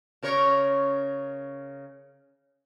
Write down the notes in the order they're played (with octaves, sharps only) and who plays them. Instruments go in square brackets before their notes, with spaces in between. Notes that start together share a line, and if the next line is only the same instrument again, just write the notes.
[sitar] C#3 A#4 C#5